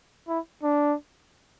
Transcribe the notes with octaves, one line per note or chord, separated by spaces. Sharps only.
E4
D4